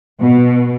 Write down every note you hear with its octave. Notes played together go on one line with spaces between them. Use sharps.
B2